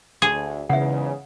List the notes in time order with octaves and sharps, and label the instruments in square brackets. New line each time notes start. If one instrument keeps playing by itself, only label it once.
[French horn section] D2 [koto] G#4
[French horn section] E2 G#2 E3 [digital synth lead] C#3 [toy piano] E5 F#5